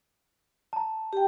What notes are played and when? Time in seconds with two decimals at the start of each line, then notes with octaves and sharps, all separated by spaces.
0.73 A5 A#5
1.13 G4 G5